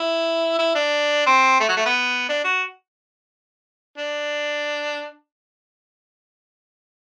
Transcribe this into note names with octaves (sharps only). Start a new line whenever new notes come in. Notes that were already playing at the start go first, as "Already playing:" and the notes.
Already playing: E4
E4
D4
C4
A3
F#3
A3
B3
D4
F#4
D4